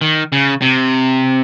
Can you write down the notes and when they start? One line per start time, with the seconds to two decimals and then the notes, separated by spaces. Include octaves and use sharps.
0.01 D#3
0.32 C#3
0.62 C3